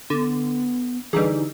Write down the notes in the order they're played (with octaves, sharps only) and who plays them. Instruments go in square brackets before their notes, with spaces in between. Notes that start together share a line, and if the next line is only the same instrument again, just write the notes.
[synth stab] D3 [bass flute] B3
[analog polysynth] D3 D#4 G#4 [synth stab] E3 G3